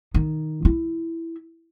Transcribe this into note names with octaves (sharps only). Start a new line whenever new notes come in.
D#3
E4